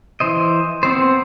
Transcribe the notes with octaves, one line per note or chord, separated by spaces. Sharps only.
E3 C5 D#5
B3 C4 C5